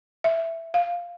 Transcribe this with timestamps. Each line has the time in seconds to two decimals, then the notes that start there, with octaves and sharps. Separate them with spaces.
0.24 E5
0.74 F5